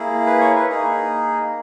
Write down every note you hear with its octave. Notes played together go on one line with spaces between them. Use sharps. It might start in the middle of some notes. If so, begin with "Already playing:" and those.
Already playing: A#3 E4 G#4
B4
C#5
B4
A#3 D#4 G#4